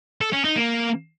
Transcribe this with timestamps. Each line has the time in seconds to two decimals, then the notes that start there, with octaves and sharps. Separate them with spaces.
0.21 A4
0.33 C#4
0.44 D#4
0.56 A#3